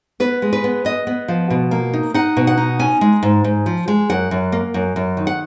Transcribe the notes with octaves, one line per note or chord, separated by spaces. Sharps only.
B3 B4
G#3
B4
B3
B3 D#5
B3
F3
B2
A#3
D#4
D#4 F#5
B2
F#5
D#4
C#4 G#5
G#3
G#2
G#2
F3
G#3
F#2 F#5
F#2
A#3
F#2
F#2
D#3
F#5